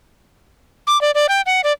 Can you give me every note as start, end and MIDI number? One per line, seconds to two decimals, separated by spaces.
0.87 1.00 86
1.01 1.11 74
1.15 1.26 74
1.29 1.41 79
1.46 1.61 78
1.64 1.72 74